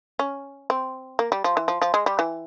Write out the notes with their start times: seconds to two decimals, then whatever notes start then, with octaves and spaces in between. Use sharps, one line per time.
0.19 C#4
0.70 C4
1.19 A#3
1.32 G3
1.44 F3
1.57 E3
1.68 F3
1.82 F3
1.94 G#3
2.06 G3
2.19 E3